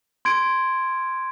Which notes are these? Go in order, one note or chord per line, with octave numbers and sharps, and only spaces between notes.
C6 G#6 D7